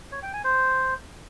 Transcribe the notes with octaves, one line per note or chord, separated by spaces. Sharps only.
C#5
G5
G#5
C5